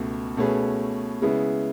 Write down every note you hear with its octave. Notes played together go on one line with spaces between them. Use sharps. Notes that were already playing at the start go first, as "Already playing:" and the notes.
Already playing: C#2 B2 A3
B2 A3 C#4 G#4 B4
C#3 G#3 B3 E4